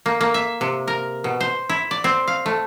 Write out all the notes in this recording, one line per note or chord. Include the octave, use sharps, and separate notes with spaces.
A#3
A#3
E5
C3
A#4
B2
C5
E4
D5
C4
F5
A3